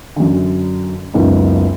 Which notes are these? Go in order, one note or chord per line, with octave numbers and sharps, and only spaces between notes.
F#2 D3
F#1 C#2 B3 D#4